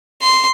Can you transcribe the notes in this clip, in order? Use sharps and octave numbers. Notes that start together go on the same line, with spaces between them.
C6